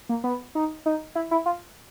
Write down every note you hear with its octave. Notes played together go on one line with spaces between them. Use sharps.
A#3
B3
D#4
D#4
E4
E4
F4